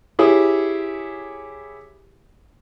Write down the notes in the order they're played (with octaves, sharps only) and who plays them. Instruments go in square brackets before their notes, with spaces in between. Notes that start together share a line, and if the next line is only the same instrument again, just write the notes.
[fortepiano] E4 G4 G#4 C#5